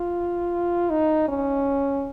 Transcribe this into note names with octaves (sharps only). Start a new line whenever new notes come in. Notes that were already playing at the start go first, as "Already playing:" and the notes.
Already playing: F4
D#4
C#4